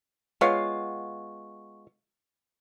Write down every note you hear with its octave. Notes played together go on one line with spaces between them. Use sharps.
G#3 B3 F4 C#5 F5 C#6